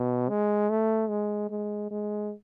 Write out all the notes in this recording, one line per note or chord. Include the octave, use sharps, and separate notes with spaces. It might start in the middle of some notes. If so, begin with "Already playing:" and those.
Already playing: B2
G#3
A3
G#3
G#3
G#3